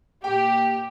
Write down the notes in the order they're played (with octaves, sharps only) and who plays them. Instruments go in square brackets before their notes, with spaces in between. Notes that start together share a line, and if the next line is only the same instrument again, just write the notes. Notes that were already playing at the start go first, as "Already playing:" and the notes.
[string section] A#2 G4 [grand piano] G5